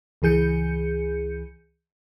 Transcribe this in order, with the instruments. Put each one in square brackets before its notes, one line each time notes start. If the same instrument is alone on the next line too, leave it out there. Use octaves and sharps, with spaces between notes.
[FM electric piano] C#2 E3 G#4 G6 C#7